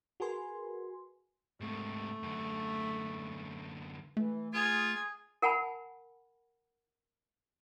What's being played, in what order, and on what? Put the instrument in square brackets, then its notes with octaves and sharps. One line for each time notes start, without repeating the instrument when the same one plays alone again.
[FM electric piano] F#4 G#4 A#4 B4 G#5 C6
[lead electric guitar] G#2 C3 [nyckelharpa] A3
[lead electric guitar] F#2 D3
[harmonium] E3 [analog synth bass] A3
[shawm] F4 [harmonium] G#4 [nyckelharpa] G#5
[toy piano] A#4 F#5 G#5 A5 B5